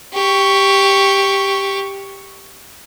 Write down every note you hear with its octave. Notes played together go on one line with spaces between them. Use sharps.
G4 C#6